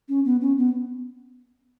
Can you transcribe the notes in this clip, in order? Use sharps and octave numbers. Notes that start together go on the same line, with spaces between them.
C#4
B3
C#4
B3